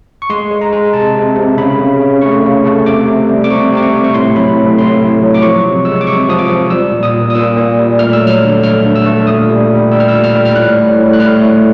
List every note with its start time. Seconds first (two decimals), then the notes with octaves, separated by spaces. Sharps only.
0.22 C#6
0.30 G#3 C6
0.51 G#3
0.61 A#5
0.73 G#3
0.93 C3 A5
1.15 C3
1.36 C3
1.58 C#3 B5
1.79 C#3
2.00 C#3
2.21 A3 C#6
2.43 C#3
2.65 A3
2.86 C3 D6
3.07 C3
3.29 G3
3.44 D6
3.50 C3 C#6
3.72 C3 D6
3.83 C#6
3.93 C3
4.04 C#6
4.14 A2 C6
4.35 F#3 B5
4.57 A2
4.78 A2 C6
5.00 A3
5.21 F#3
5.34 D6
5.42 F3 C#6
5.63 C3
5.85 G#3 E6
6.01 D6
6.07 C3 C#6
6.28 F3 D#6
6.39 D6
6.49 F3
6.70 G3 E6
6.92 A#2
7.03 D#6
7.13 A#2
7.30 D#6
7.35 A#2 E6
7.57 A#2
7.78 G3
7.99 A3 F6
8.13 E6
8.21 F#3
8.27 F6
8.42 D3
8.63 A3 F6
8.85 D3
8.95 E6
9.06 A3
9.27 A#2 D#6
9.49 G3
9.70 G3
9.91 G3 E6
10.00 F6
10.08 A#2 E6
10.24 F6
10.35 G3
10.45 F6
10.55 A2 F#6
10.78 A2
10.98 A2
11.13 F#6
11.20 A2 F6
11.41 A3